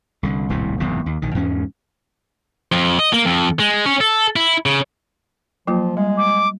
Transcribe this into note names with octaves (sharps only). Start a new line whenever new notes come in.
C2 D3
D#1 C2 A2 C3
F#1 E2 G#2 C3
D#2
A#1 D#3
E2 G#2 G#3 C#4
F2
D#5
A#3
F2
G#3
C#4
A4
E4
C#3
F3 F#3 A#3 F4
G3 G#3
D6